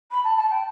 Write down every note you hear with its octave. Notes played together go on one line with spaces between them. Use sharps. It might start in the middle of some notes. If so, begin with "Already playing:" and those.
B5
A5
A5
G5